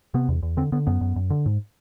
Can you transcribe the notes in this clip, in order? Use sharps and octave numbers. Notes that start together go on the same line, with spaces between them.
C3 B3
E2
E2
D3 C4
D3 B3
F#2 B3
F#2
F#2
D3
G#2